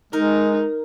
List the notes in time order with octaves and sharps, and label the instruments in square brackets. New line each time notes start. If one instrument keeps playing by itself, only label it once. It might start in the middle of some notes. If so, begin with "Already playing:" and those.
[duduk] G#3 [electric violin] D#4 [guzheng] A#4